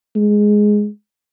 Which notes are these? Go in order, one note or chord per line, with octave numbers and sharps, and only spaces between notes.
G#3